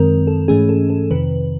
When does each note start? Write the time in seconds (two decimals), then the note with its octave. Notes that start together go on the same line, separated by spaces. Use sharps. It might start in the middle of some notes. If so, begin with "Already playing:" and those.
Already playing: F#2 D#3 G#3 C4 A#4
0.27 A4
0.48 G#2 E3 A3 C#4 G#4
0.69 A4
0.90 A4
1.11 F2 C3 D#3 B4